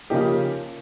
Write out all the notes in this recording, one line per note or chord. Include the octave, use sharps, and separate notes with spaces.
C#3 F3 A#3 D#4 G4